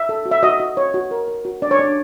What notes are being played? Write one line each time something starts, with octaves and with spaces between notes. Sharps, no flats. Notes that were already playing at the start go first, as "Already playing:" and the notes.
Already playing: E5
A4
F#4
E5
F#4 D#5
F#4
C#5
F#4
A#4
A#4
F#4
D4 D5
C#5
D4 D5